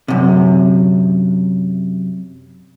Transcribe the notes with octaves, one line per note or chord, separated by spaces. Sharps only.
F#2 C3